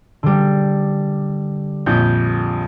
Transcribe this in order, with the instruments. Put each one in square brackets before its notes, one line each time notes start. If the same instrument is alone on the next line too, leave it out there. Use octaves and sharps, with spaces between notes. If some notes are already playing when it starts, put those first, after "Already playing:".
[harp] D3 G3
[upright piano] A#1 F2 [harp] G6